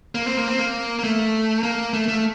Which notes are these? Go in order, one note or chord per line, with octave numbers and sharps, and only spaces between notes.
A#3
C4
A#3
C4
A#3
A#3
A3
A#3
A3
A3